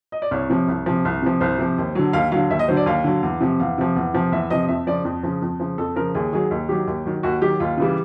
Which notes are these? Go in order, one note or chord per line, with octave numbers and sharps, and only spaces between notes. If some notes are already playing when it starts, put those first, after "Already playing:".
D#5
D5
C2 C#5
C3 F3
C2
C3 F3
C2
C3 F3
C2 C5
C3 F3
D#2
D3 F#3
D#2 F5
D3 F#3 F5
D#2 E5
D#5
D3 F#3 C5
D5
D#2 F5
D3 F#3
E2
C3 F3
E2 F5
C3 F3
E2
C3 F3
E2 E5
C3 F3 D#5
F2 E5
C#3 F3 D5
F2
C#3 F3
F2
C#3 F3
F2 A4
C#3 F3 A#4
D#2 G#4
D#3 F#3 G#4
D#2
D#3 F#3 G4
D#2
D#3 F#3
D#2 F#4
D#3 F#3 G4
D#2 F4
C#3 E3 G3 F4